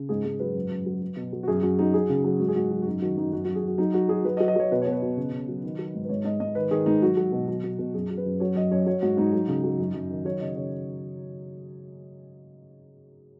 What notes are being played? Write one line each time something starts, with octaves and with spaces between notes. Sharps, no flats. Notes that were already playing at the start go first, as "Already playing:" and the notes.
Already playing: C#3
G#2 G#4
G#2 G#4
F#3 B4
F#2
F#2
F#3
F#3
B2
F#3
F#4
F#2 G#4
F#2 F#4
F#3 D#4
F#3 G#4
C#3
F#3
G#2 F#4
G#4
G#2 F#4
F#3
F#4
F#2 D#4
D#3 F#4
F#2 D#4
F#2 F#4
F#4
F#2
G#4
F#2 F#4
F#3 D#4
F#3 F#4
F#3 G#4
F#3 B4
D#5
F#3
D#5
F#3 C#5
B2 B4
C#5
B2
B4
B2
C#3
C#3
F#3
D#3
F#3
G#2
B4
G#2 C#5
G#2 D#5
G#2 D#5
D#3 B4
D#3 G#4
G#2 D#4
F#3 F#4
F#3
B2
F#3
B2
B2
F#2 G#4
F#3
B4
F#2
F#3 C#5
F#2 D#5
F#2 C#5
F#3 C#5
G#2 F#4
G#2 D#4
F#3
C#3
F#3
F#2
F#2
D#3
F#3 C#5
C#3 D#5
C#3 C#5